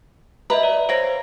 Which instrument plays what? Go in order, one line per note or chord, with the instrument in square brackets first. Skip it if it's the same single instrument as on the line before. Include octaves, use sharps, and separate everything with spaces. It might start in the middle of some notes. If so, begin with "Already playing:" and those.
[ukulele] B4 [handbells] D#5 E5 A#5
[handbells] D5
[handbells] C5 A#5 A#6 [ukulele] C#5 F5